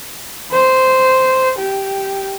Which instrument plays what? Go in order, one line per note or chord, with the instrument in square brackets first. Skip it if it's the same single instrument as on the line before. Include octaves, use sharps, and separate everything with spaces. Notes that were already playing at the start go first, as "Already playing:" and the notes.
[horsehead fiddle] C5
G4